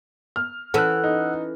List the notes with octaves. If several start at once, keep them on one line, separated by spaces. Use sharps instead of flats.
F6
E3 C#4 A4 F#5 E6 F#6
D#4